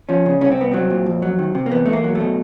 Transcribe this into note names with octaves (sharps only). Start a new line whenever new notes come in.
F3 C#4
C#3
C2 C#4
C4
C2 B3
F#3 C4
A#2
F2
F#3
D#3
C3
A#3
E2 B3
E2 A3
A#3
F#3
A3
B2